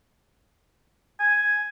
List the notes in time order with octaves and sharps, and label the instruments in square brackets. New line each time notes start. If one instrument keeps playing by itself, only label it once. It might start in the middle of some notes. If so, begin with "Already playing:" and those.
[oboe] G#5